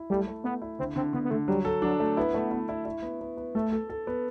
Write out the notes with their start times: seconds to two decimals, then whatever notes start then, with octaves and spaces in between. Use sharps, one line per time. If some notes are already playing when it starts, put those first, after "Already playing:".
Already playing: E4
0.10 G3 A3
0.28 A3
0.44 A3 B3
0.62 E4
0.79 D3 C4
0.96 D3 C4
1.13 D3 B3
1.24 B3
1.31 D3 A3
1.48 F#3 G3
1.65 A4
1.82 F#3 D4
2.00 A3
2.17 B3 E4
2.34 A3
2.51 E4
2.69 E4
2.85 E4
3.02 B3
3.21 B3
3.37 B3
3.55 A3 A4
3.72 A4
3.90 A4
4.07 B3